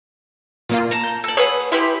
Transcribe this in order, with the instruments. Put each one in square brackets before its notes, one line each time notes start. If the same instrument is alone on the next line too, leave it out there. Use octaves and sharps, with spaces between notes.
[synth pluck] A#2 A#3 F4
[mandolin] A5 A#5
[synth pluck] G6
[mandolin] A4 D5
[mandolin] G#4 B4 F#5 [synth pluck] C#5
[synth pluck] E4 [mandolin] G4 B4 C6